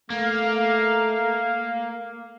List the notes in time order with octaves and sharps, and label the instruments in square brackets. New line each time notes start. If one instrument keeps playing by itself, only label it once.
[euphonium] A3 [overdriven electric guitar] A#3 [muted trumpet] F5